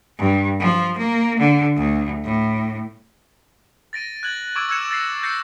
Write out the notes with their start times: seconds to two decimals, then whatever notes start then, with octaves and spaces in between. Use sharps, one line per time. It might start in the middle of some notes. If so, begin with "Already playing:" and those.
0.19 G2
0.60 F3
0.98 A#3
1.39 D3
1.76 D2
2.24 A2
3.93 A6 A#6 D7 D#7
4.23 F#6 G#6 F#7
4.56 C#6 D6 E6 G#6 D7
4.69 E6 F#6 G#6 C#7 E7
4.91 A6 A#6 C7 E7
5.23 G6 A#6 C7 C#7